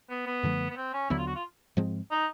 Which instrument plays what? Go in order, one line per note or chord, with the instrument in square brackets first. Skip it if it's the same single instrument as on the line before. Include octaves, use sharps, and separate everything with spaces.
[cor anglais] B3
B3
[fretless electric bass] F#2 D3 F3 A3
[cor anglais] B3
C4
C#4
[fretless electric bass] D#2 D3 F#3 B3 [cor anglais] E4
[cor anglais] F4
F#4
F4
[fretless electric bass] G#2 F3 G#3 C4
[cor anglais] D#4